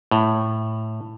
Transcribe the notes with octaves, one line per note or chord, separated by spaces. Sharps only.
A2